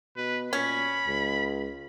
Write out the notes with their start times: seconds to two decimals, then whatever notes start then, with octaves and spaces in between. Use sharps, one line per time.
0.17 B2 B4
0.53 A#2 C#4 B5
1.07 C#2